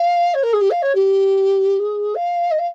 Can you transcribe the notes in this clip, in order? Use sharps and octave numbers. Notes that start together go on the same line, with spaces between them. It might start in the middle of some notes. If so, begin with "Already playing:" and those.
Already playing: F5
C#5
A#4
G#4
G4
F5
C#5
G4
G#4
F5
D#5
F5